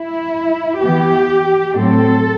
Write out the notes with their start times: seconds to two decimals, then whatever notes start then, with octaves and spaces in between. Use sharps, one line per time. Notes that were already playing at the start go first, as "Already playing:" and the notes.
Already playing: E4
0.82 E3 B3 G4
1.74 A2 F#3 C4 A4